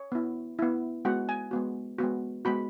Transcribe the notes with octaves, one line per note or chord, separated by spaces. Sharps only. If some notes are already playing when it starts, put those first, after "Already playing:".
Already playing: C#5
B3 E4
B3 E4
G#3 B3 F#4 F#5
G#5
G#3 B3 F#4
G#3 B3 F#4
G#3 B3 F#4 B5